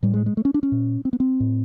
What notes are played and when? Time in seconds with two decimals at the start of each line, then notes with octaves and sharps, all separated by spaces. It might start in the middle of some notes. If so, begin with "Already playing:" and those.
0.03 A2 G3
0.14 G#3
0.26 G#3
0.37 A3
0.45 C#4
0.54 D4
0.63 C#4
0.72 A#2
1.05 C4
1.13 B3
1.20 C4
1.40 A2